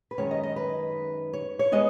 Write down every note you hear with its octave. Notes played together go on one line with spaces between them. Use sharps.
B4
F#2 D#3 G#3 C#4 C#5
D#5
D#5
B4
C#5
C#5
G#3 B3 D#4 D#5